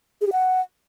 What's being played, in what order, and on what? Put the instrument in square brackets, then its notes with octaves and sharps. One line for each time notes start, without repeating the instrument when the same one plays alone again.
[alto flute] G#4
G4
F#5